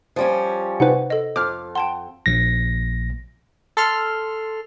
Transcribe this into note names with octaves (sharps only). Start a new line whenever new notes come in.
F3 G3 C#4
C3 D#4 B4 C5 F#5
A4 D#5
F2 D6 F6
F#5 G5 A5 C6
A#1 A#6
A4 C6 F6